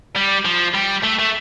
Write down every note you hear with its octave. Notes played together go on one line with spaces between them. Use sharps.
G3
F3
G3
A3
A3